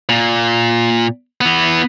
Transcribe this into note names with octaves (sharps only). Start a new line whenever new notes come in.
A#2
E3 B3